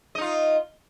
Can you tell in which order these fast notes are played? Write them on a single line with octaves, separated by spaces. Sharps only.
D#5 D#4 F4